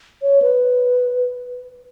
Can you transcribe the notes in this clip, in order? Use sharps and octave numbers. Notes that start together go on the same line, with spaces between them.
C#5
B4